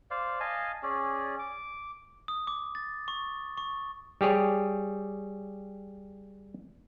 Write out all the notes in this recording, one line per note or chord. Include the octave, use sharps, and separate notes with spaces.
C5 D5 F5
D#5 F5 G#5 A5
C#4 G#4 D5
D6
D#6
D6
A6
C#6
C#6
G3 G4 G#4 C#5